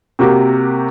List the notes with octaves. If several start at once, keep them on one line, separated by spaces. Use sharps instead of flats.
C3 A#3 F#4 G4 A#4